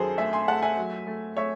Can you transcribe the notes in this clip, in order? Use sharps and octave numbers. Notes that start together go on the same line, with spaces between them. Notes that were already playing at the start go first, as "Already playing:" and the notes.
Already playing: F#2 D#3 G#4 A4 C5
A3 E5 G#5
G#5 C6
A3 F#5 A5
E5 G#5
F#3
A3
A3 C#5 E5